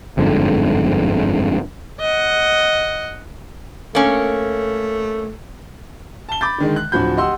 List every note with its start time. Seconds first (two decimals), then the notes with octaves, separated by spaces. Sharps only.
0.17 G1 F2 G#2 D3
2.00 D#5 F#5
3.95 A3 A#3 C#4
6.29 A5 G7
6.41 B5 D6 G6 A6
6.58 D3 D#3 G#3
6.76 F#6
6.92 D1 D3 F3 F#4 B5 G6
7.17 G4 D#5 F#5 C6 E6